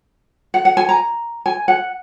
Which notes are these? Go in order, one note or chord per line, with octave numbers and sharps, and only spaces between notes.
F#5
F#5
G#5
A#5
G#5
F#5